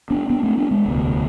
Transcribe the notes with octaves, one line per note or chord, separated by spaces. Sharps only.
B3 D4
B3 D4
A3 C4
B3 D4
G#3 B3
E1 D2 C3